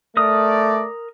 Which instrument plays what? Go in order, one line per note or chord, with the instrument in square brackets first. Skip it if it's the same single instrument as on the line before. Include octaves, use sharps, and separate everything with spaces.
[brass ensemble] A3 D5 [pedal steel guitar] A#4 D#6